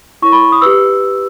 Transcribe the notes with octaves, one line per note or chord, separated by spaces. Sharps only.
E4 A#4 C#5 C#6
B5
D#6
G4 B4 E6